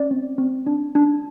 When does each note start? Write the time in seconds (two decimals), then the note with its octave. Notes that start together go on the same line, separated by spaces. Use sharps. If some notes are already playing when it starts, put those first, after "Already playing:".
Already playing: C#4 D5
0.11 C4
0.38 C4
0.67 D4
0.95 D4